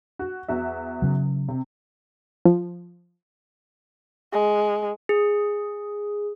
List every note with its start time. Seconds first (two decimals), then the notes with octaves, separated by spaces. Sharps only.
0.19 F#4
0.48 E2 F#4 E5
1.02 C#3 F#3
1.48 C3
2.45 F3
4.32 G#3
5.09 G#4